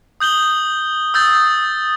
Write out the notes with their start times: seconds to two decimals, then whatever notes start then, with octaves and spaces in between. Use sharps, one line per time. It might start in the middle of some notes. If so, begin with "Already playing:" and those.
0.20 D#6 G6 F#7 G7
1.14 D#6 E6 G6 A6